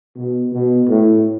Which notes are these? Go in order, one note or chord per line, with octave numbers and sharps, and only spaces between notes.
B2
B2
A2